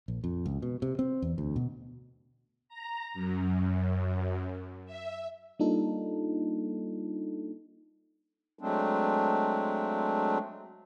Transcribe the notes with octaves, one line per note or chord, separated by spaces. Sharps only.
A#1
F2
C#2
B2
C3
C4
E2
D2
B2
A#5
F#2
E5
G3 A#3 D4 D#4 F4 A4
F#3 G#3 A3 C4 D4